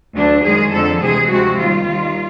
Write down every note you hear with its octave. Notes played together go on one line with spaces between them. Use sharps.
D2 D3 F#3 D4
F#2 D#3 G#3 G#4
F2 D3 F3 G#3 A4
D2 C3 E3 G#3 G#4
D2 C3 F3 G#3 F#4
D#2 D#3 G3 F4
D#2 D#3 G3